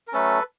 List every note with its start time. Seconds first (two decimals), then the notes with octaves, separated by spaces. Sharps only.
0.08 A#4
0.13 F#3 A3 C#4 A4 B4